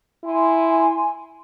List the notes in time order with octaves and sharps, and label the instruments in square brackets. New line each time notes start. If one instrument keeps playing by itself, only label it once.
[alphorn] E4 [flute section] G#5 C6